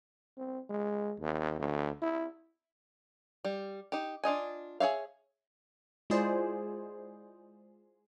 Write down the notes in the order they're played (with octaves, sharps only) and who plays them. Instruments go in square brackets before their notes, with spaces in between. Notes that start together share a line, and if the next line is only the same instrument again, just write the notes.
[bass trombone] C4
G#3
D#2
D2
E4
[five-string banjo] G3
D#4 G4
D4 F4 D#5 G#5
G#4 C#5 E5 F5
[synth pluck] G#3 E4 F4 G#4 C5 D5